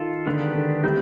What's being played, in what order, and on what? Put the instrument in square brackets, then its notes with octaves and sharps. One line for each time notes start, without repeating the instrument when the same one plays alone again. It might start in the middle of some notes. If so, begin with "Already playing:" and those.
Already playing: [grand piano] D#3 [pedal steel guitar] F4 A4
[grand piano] D3 [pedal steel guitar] D#3 G#3 B3 D4 G4
[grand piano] D3
[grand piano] G3 [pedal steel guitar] A3 C4 D#4